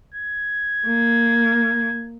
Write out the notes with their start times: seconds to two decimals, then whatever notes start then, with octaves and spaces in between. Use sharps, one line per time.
0.14 G#6
0.87 A#3